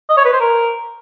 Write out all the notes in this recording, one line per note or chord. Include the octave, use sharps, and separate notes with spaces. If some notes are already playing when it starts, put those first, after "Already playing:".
D#5
C#5
B4
C5
A#4